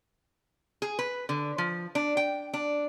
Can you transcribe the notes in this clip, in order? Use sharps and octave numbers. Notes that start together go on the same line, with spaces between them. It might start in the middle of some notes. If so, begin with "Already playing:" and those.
G#4
B4
D3
F3
D4
G5
D4